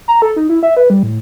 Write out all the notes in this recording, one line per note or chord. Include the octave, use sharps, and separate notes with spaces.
A#5
A4
D#4
E4
E5
B4
G3
A2